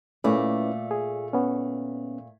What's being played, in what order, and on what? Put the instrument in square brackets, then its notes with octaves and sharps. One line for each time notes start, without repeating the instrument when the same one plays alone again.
[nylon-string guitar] A#2 A3 D5 [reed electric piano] C#4 E4 B4
[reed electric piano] G#4
B3 C#4